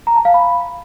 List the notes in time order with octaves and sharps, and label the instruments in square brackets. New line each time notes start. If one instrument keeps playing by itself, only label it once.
[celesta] A#5
A5
F5
B5